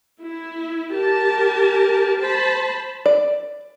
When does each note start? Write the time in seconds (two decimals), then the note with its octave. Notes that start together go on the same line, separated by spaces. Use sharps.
0.21 E4
0.93 G4 A#4 A5
2.19 C5 A5 B5
3.06 D5